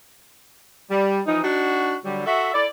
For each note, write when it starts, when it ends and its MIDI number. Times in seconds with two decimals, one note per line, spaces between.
0.91 1.21 55
1.26 1.39 52
1.26 1.39 53
1.26 1.39 63
1.43 1.95 62
1.43 1.95 63
1.43 1.95 66
2.04 2.25 50
2.04 2.25 54
2.04 2.25 55
2.26 2.51 66
2.26 2.51 69
2.26 2.51 76
2.54 2.66 64
2.54 2.66 69
2.54 2.66 74